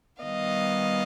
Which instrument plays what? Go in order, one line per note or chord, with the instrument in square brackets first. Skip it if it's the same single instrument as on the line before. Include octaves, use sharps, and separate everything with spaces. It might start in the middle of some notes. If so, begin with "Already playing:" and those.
[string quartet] D#3 G3 B3 D#5 F5